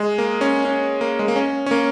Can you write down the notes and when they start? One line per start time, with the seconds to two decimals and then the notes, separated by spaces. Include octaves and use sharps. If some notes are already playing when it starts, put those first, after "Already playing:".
Already playing: G#3
0.18 A#3
0.41 C#4
0.65 C#4
1.01 A#3
1.19 G#3
1.28 A#3
1.36 C#4
1.66 C#4
1.71 A#3